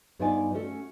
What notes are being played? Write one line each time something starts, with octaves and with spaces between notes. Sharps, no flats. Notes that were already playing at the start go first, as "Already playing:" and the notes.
G2 B3 D#4 F4 D5 G#5
A3 C#4 F#4 A4